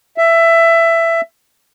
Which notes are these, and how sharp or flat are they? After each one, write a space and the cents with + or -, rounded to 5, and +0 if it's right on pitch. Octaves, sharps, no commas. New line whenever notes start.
E5 +15